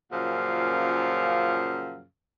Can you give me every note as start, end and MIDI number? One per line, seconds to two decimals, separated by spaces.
0.12 2.04 42
0.12 2.04 46
0.12 2.04 49
0.12 2.04 53
0.12 2.04 77